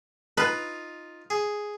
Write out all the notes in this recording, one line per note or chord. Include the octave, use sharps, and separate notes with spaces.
D#4 F4 B4
G#4